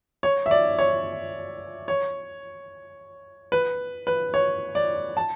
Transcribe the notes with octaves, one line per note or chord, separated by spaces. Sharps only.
C#5
E5
D5
C#5
C#5
B4
B4
C#5
D5
A5